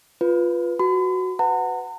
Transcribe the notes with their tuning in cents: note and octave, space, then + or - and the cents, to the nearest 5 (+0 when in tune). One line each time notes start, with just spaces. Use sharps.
F4 +0 B4 -5
F#4 +0 B5 +45
B4 +20 F#5 +0 A#5 -45